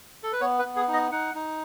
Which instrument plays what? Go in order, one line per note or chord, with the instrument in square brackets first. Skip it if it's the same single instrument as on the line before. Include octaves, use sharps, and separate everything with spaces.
[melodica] A4
B4
B3 C#5
B4
B3
G#4
D#4
D#5
D#4 F#5
D#4